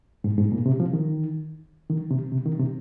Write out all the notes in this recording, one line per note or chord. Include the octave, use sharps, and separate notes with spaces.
G#2
G#2
A#2
C3
F3
D#3
D#3
C3
C3
D#3
C3